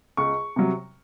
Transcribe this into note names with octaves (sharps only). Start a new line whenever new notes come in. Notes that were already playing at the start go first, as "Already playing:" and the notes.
C#2 C#6
C3 F#3